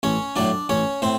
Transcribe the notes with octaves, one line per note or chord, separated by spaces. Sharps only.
A1 C#4 C#5
A2 F#3 D4 D5
A1 C#4 C#5
A2 C4 C5